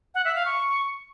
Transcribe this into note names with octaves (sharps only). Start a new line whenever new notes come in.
F#5
E5
F5
C#6